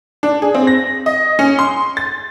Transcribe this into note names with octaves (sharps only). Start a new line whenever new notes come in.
D4
G#4
C4
A#6
D#5
C#4
C6
A6